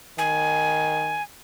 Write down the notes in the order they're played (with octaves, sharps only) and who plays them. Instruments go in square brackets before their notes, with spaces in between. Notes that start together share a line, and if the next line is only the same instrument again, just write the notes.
[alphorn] D#3 [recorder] G#5